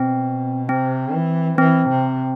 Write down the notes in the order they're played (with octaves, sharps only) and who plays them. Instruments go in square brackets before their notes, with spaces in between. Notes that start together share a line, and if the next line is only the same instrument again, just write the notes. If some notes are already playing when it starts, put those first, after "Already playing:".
Already playing: [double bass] B2 [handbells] C4
[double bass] C3 [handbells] C4
[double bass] E3
[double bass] E3 [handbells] C4
[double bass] C3